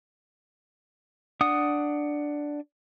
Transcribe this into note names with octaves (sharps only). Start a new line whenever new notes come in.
D4 F#5 D#6